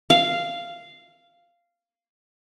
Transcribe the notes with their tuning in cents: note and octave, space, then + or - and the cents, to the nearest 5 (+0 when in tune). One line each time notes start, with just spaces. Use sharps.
F5 -10